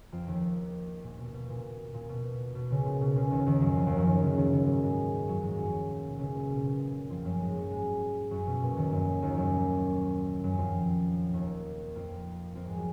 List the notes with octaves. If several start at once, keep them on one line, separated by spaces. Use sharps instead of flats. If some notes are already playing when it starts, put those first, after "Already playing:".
F2 F3
D#2 D#3
A#2
B2
B2
A#2
A#2
B2
B2
C#2 C#3
A#2
B2
C#2 C#3
D#2 D#3
D#2 D#3
F#2 F#3
F2 F3
D#2 D#3
F#2 F#3
D#2 D#3
C#2 C#3
D#2 D#3
D#2 D#3
G#2 G#3
G#2 G#3
F#2 F#3
G#2 G#3
F#2 F#3
A#2
B2
C#2 C#3
A#2
B2
A#2
A#2
F2 F3
F#2 F#3
G#2 G#3
F#2 F#3
G#2 G#3
F#2 F#3
B2
A#2
D#2 D#3
F#2 F#3
D#2 D#3
F#2 F#3
F#2 F#3
F2 F3
D#2 D#3
F2 F3
F2 F3
G#2 G#3
F#3